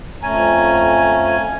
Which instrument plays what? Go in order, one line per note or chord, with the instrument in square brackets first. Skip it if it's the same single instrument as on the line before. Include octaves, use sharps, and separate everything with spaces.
[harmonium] F2 A3 A#5 [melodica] C#4 G#5